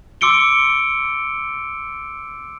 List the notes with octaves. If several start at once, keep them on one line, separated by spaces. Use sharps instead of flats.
C6 D6 E6 C#7 D7 G7